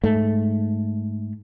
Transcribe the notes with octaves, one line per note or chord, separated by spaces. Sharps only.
G#2 A3